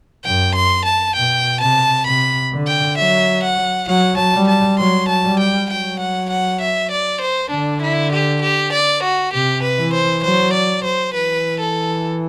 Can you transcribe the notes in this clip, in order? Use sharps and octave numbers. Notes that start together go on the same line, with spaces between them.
F#2 G5
C6
A5
B2 G5
C3 A5
C3 B5
D3
G5
F#3 E5
F#5
F#3 F#5
A5
G3
A5
F#3 C6
A5
G3
G5
F#3 G5
F#5
F#5
E5
D5
C5
D3 D4
E4
G4
G4
D5
F#4
C3 G4
B4
E3
C5
F#3 C5
D5
C5
E3 B4
A4